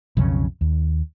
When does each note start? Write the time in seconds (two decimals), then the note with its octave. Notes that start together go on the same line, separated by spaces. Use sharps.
0.17 B1 F2 C#3 C#4
0.61 D#2